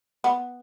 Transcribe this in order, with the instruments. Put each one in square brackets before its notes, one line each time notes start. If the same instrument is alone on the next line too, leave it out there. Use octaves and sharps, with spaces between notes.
[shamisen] B3